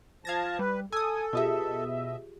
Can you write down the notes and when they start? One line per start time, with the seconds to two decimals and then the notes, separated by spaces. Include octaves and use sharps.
0.25 F3 F5 A5 G#6 A#6
0.59 G3 B4
0.93 A4 G#5 D#6 E6
1.33 B2 F4 G4 G#4 D#5 E5